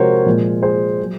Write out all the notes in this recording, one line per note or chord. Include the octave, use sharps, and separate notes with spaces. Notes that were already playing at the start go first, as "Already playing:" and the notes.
Already playing: C3 F3 G#3 F#4 A#4 C5 C#5
A#2 F3 G#3
G#4 C5
F#3